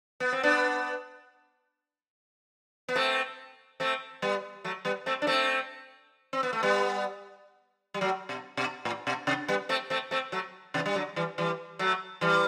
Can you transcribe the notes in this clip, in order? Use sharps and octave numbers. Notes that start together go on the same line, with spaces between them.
B3
C4
B3 D4
B3
A3 C4
A3 C4
G3 B3
F#3 A3
G3 B3
A3 C4
D4
A3 C4
C4
B3
A3
G3 B3
G3
F#3 A3
B2
B2
A2
B2
C3
G3 B3
A3 C4
A3 C4
A3 C4
F#3 A3
C3 E3
G3
D3 F#3
E3 G3
E3 G3
F#3 A3
E3 G3